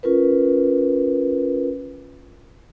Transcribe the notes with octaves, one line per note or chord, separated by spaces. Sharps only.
C#4 F4 A#4 B4